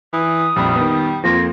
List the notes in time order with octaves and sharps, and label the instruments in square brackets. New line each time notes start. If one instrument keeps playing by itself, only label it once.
[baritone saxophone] E3 [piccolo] D#6
[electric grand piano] A#1 F2 B5 [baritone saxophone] G3
[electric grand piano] D#3 B3
[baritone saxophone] F2 [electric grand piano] F3 A#3 C6 [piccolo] A#6